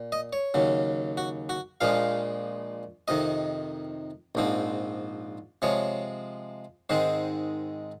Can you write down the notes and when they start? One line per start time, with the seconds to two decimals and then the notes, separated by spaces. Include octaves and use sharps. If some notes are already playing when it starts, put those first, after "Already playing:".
Already playing: A#2
0.12 D#5
0.33 C#5
0.54 D#2 C#3 F#3
1.17 F#4
1.49 F#4
1.81 A#1 A#2 F3 G#3 F5
3.08 F2 C3 D#3 D#5
4.35 A#1 G#2 F3 C4
5.62 C3 F3 G#3 C#5
6.89 G#2 D#3 G#3 C4 C5